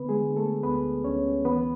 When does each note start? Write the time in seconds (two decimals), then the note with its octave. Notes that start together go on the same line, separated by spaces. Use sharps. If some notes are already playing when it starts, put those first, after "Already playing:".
Already playing: D3 B3 B4
0.09 G#3 G#4
0.23 D3
0.36 A3 A4
0.63 D2 B3 B4
1.04 D2 C#4 C#5
1.45 E3 B3 B4